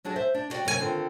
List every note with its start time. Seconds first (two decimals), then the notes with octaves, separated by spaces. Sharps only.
0.04 F#3 D4 F#4 G#4
0.16 C5 E5
0.35 D4
0.50 E4 F#4 G4 D5 G5
0.65 F#2 C3 A#3 C#4 G#4 G#5
0.79 D3 D#3 C4 F4